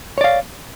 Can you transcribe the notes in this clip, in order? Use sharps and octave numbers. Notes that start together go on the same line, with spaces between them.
C#5 D5 F5